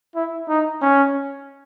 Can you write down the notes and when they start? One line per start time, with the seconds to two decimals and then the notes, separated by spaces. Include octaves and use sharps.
0.16 E4
0.49 D#4
0.82 C#4